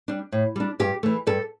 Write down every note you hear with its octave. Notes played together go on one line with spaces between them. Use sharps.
G3 D4
A2
G3 D4
G2 G4
E3 A3
G2 A4